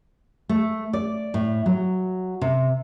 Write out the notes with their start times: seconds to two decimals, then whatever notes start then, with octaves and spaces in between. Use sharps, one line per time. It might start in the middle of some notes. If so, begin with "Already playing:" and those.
0.49 A3
0.93 D5
1.34 A2
1.66 F#3
2.42 C3